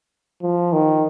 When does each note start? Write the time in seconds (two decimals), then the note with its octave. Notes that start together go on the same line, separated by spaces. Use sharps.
0.43 F3
0.73 D#3